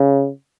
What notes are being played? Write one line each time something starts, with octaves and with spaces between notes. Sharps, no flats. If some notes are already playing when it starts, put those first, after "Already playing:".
Already playing: C#3